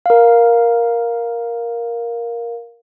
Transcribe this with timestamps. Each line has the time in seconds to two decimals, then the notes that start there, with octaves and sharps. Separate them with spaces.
0.06 A#4 F5